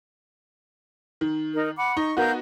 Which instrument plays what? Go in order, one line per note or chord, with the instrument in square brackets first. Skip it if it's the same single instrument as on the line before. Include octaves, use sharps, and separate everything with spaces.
[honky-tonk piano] D#3
[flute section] D#4 A#4
F#5 B5 D6
[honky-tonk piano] D#4 [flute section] C#6
[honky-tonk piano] B3 D#4 F#4 [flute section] A#4 F5 G6